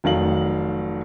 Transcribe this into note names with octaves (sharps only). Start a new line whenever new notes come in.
F1 D#3 F#3 F5 F#7